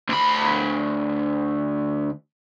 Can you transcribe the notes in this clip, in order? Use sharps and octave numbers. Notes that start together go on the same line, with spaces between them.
D2 B5